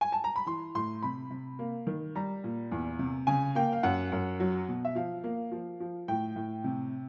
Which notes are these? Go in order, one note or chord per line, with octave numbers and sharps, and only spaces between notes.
G#5
A5
A#5
B5
E3 C6
A2 C6
C3 B5
C3
A#3
D#3
G3 A#5
A#2
E2
C3
C#3 G#5
A#3 G5
F5
F#2 F#5
F#2
F#3
B2
E5
F3 F5
A#3
F3
F3
A2 G5
A2
C3